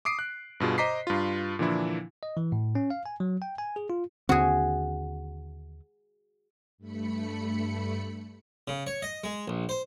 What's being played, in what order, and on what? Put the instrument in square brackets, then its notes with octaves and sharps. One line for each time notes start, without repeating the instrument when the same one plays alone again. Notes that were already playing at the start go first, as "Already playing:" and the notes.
[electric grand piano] D6 D#6 C7 D7
F#6
G2 B2 F4 G#4
C5 D#5 A#5 D6 B6 C7
G2 F4
A#2 D3 E3 F3 D4 E4
[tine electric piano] D#5
E3
A2
C#4
F5
G#5
F#3
G5
G#5
G#4
F4
[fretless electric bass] D#2 D3 C4 [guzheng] F#4 G#4
[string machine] G2 A3 B5 C#7
[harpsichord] C#3
C#5
D#5
G#3
A#1
C5